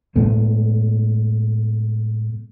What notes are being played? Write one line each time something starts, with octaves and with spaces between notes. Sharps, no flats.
A2 G#3 A3 B3